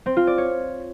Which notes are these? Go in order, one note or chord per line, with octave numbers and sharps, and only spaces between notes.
C4
F4
D5
C#5